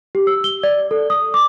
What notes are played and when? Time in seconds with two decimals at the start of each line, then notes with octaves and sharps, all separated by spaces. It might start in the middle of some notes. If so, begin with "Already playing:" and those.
0.15 G4
0.27 E6
0.44 G7
0.63 D5
0.91 A4
1.10 D#6
1.34 D6